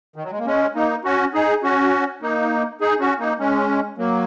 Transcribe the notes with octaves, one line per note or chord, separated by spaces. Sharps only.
D#3
F#3
G#3
A#3
G#3 C#4
A#3 D#4
C#4 F#4
D#4 G#4
C#4 F#4
A#3 D#4
D#4 G#4
C#4 F#4
A#3 D#4
G#3 C#4
F#3 A#3